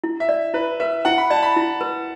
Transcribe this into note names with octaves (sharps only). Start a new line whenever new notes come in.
E4
E5
D5
E4 B4
B4 E5
E4 F#5
B5
D5 A5
B5
E4
B4